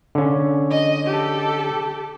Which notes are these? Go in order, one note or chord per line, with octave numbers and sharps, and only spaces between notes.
D3 C#4
D#5
G4 A4